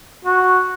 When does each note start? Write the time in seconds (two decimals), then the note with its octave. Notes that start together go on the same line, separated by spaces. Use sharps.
0.25 F#4